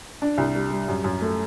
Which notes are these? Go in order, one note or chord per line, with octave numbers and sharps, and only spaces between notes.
D4
C2
G3
G3
F#2
F#2
A3